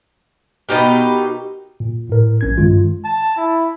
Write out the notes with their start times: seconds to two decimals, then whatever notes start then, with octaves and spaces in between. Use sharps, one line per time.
0.69 B2 D#4 G4 A#4
1.80 A#2
2.10 A2 A#4
2.41 A#1 C#4 G#6
2.58 G2 D#3 G#3 F4
3.04 A5
3.37 E4